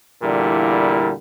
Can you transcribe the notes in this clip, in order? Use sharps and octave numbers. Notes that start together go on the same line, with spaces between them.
E2 A#2 D3 G3 A#3 E4